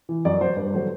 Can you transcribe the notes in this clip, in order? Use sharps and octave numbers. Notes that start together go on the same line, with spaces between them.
E3
F#2 D5
F#3 C5
G2 B4
D3 F#3 C5